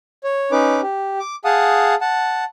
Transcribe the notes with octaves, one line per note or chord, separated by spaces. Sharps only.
C#5
C#4 D#4 B4 D6
G4
D6
G#4 F5 F#5 A5 D#6
F#5 A5